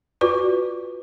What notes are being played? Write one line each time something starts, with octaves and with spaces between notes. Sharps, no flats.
F4 F#4 B4 D5 C#6 D6